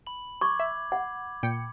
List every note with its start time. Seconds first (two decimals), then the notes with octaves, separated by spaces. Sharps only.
0.07 B5 F#7
0.41 C#6 D6 G#6
0.60 E5
0.92 F#5
1.43 A#2 G5 C#7